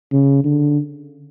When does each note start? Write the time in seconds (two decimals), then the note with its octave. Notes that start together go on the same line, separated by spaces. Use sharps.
0.12 C#3
0.44 D3